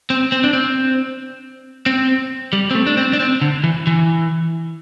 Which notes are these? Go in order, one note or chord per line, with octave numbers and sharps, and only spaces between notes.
C4
C4
D4
C4
C4
G3
C4
A3
D4
C4
D4
C4
D3
E3
E3